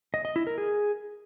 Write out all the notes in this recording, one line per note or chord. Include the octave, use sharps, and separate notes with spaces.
D#5
D#5
E4
A#4
G#4